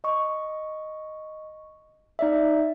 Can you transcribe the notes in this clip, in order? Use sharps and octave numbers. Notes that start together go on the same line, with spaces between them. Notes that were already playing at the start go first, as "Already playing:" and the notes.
D#5 C#6
D#4 D5 E5